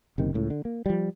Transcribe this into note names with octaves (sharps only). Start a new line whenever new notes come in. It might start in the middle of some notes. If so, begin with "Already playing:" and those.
F#1 C3 D#3
C#2 A2
D3
A#3
F3 G3